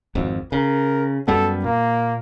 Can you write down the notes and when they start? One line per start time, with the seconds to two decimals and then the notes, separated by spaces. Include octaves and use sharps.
0.15 G#1 F2
0.52 C#3 A#4
1.28 F#2 G3 B3 A4
1.64 A#2 A#3